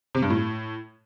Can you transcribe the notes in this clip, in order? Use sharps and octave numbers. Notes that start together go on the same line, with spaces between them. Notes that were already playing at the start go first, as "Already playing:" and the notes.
C3
G2
A2